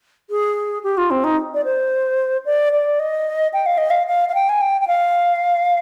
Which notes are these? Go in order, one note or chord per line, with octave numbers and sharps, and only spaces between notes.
G#4
G4
F4
C4
D#4
D5
C5
D5
D5
D#5
G5
F5
D#5
F5
F5
F5
G5
G#5
G5
G5
F5